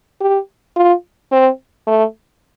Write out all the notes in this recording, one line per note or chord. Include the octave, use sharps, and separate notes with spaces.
G4
F4
C4
A3